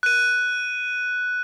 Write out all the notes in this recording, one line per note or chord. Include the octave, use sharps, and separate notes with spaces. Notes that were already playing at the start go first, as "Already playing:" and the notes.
F#6 D#7